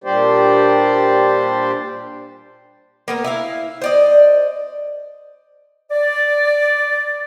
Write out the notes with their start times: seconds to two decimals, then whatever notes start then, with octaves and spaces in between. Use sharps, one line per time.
0.04 A#2 G3 D4 G4 C5 D5
3.08 A#3 B3 A#4
3.24 E4 E5 F5
3.82 C5 D5 D#5
5.90 D5